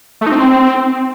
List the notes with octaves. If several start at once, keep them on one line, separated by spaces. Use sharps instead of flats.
A3
D#4
C4